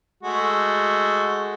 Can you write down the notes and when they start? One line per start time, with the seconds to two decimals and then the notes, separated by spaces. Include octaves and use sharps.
0.23 G#3 A3 F#4